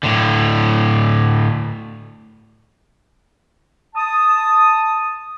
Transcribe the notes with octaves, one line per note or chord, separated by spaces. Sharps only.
A2 D3
A5 D#6